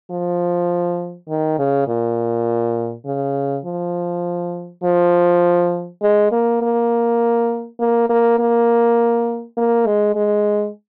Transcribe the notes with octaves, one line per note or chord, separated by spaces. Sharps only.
F3
D#3
C#3
A#2
C#3
F3
F3
G#3
A#3
A#3
A#3
A#3
A#3
A#3
G#3
G#3